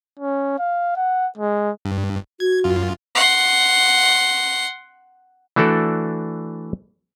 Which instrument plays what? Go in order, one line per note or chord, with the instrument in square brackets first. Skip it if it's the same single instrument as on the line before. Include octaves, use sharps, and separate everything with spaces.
[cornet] C#4
F5
F#5
G#3
[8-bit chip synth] G2
[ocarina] F#4 [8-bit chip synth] G#6
[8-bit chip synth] F#2 F4
[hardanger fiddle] F#5 C6
[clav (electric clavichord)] E3 A3 D4 F#4 A4 D5